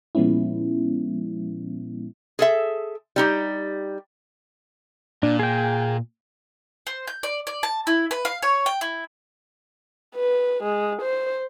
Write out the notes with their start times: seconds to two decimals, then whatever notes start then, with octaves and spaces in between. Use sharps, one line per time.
0.15 A#2 F3 G#3 B3 C#4 E4
2.39 G#4 A4 E5
3.16 G3 D#4 G4
5.23 A#2 D4
5.39 G#4 G5
6.87 C5
7.07 G6
7.23 D5
7.47 D5
7.63 A5
7.87 E4
8.11 B4
8.25 F5
8.42 C#5
8.66 G5
8.81 E4
10.15 B4
10.63 G#3
11.01 C5